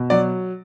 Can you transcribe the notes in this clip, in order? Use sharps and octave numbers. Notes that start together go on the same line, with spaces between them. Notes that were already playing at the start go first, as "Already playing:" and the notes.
Already playing: B2
F#3 D5